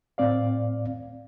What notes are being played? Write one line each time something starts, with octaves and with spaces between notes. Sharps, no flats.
A2 C4 D5 F5